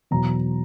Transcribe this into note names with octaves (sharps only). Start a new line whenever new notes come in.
E2 B2 F#3 A#5